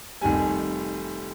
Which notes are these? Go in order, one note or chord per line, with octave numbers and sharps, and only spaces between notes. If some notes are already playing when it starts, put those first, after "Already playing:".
F1 F2 D#3 G3 G#5